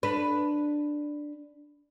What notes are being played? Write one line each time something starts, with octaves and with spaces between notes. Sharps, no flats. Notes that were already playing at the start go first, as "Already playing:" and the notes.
D4 B4